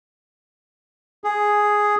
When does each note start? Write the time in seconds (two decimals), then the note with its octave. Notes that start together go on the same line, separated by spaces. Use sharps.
1.24 G#4